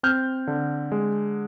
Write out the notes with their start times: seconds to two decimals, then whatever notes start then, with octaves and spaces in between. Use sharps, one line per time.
0.03 C4 F6 G6
0.47 D3
0.92 G#3